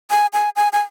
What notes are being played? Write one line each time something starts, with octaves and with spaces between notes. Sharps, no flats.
G#5
G#5
G#5
G#5